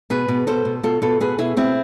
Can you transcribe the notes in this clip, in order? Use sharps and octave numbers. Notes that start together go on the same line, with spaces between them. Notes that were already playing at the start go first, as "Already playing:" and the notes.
B2 G#4 B4
B2
B2 A4 C5
B2
B2 F4 A4
B2 F4 A4
B2 G#4 B4
B2 E4 G#4
B2 C4 E4